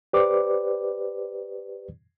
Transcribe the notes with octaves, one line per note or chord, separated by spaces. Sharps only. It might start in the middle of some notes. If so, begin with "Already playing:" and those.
G4 B4 C5 D5 D6